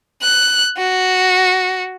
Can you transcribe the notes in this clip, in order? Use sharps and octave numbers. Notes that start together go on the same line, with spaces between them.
F#6
F#4